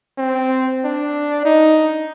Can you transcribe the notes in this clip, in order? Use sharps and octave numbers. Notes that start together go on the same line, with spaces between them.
C4
D4
D#4